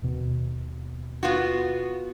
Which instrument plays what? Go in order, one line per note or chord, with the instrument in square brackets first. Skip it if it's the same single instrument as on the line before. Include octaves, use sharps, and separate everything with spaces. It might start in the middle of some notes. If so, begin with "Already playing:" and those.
[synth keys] D#2 B2
[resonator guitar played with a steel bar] B3 F4 F#4